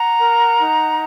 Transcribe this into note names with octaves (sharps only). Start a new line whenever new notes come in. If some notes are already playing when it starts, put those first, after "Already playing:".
Already playing: F#5 A#5
A#4
D#4